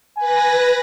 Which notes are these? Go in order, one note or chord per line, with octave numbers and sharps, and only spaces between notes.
B4 G#5 A#6